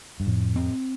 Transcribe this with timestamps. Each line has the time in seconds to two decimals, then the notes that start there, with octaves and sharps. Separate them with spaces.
0.20 G2
0.26 F2 A2
0.56 C4